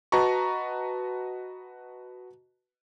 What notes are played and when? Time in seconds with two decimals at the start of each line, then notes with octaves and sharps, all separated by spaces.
0.12 F#4 B4 D#5 A5 A#5 C#6